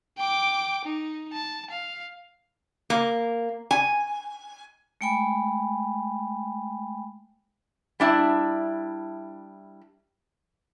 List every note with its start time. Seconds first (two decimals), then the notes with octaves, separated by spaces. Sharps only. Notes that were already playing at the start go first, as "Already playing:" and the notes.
0.18 G5 D6
0.85 D#4
1.33 A5
1.70 F5
2.90 A#3
3.71 G#5
5.01 G#3 A3 G5 G#5 B5
8.00 G3 D4 E4